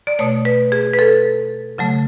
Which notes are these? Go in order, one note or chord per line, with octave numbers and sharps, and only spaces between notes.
D5
B2 A3 C#5
B4
G#4
B4
A4
C#3 F#3 A3